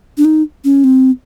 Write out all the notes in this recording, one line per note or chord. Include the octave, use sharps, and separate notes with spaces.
D4
D#4
C#4
C4